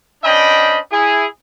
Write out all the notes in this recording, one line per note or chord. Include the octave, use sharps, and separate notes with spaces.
C#4 D4 C5 D#5 G5 B5
E4 G#4